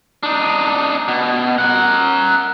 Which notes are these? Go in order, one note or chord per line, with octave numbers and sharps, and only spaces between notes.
D4 D#4
B2
A#4 F#5